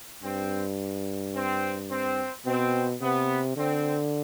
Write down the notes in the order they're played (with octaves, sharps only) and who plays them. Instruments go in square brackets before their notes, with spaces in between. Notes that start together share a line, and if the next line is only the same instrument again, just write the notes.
[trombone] G2 [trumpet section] C4
[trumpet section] C4
C4
[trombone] B2 [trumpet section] C4
[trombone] C3 [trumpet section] B3
[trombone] D3 [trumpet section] C4